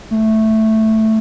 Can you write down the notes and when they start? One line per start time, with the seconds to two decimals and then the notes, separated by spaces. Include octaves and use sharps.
0.11 A3